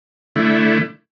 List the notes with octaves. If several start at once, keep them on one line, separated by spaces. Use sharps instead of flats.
D3 A3 E4